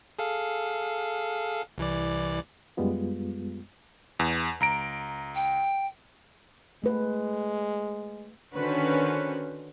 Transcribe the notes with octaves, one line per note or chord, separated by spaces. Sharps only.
G#4 A4 F5
C2 E3 D5
F#2 G3 G#3 B3 F4
E2
C#2 A#5 D7
G5
G#3 A3 B4
D3 D#3 C#4 F#4 B4 C5